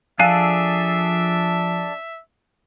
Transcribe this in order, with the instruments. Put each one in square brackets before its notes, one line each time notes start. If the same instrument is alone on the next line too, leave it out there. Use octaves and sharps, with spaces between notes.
[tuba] F3 [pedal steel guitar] D4 G#4 A4 [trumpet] E5 [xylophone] F5 G#5 F#6